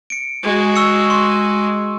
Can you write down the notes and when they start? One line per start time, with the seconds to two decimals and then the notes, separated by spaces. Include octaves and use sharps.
0.10 C#7 D7
0.43 G#3 F#4
0.76 C#6 E6 C#7
1.10 C6